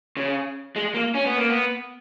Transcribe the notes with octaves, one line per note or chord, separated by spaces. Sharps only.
C#3
G#3
A#3
C#4
B3
A#3
B3